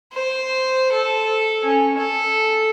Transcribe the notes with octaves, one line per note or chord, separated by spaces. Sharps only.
C5
A4
C#4
A4